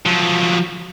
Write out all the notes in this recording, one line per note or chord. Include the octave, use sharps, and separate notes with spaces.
F3 F#3